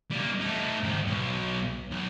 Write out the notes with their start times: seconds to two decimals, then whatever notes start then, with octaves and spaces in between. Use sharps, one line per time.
0.11 G3 A#3
0.40 A3 D#4
0.84 G#2 D#3
1.07 B1 B2
1.91 B1